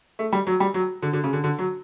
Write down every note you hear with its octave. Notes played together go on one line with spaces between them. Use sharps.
A3
G3
F#3
G3
F#3
D3
D3
C#3
D3
D3
F#3